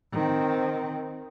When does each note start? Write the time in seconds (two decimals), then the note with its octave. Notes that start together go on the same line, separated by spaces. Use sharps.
0.12 D#3 C4